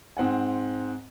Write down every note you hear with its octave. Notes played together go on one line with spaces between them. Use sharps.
G#2 C4 F#5 G#5